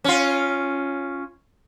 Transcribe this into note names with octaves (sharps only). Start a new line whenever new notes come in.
C#4 F4